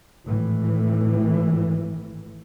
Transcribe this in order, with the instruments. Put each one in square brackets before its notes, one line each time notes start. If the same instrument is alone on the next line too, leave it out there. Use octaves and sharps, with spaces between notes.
[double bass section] G#1 A2 E3